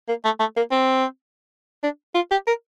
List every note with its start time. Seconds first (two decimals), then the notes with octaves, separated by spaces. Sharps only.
0.08 A#3
0.25 A3
0.40 A3
0.57 A#3
0.71 C4
1.84 D4
2.15 F4
2.31 G4
2.47 A#4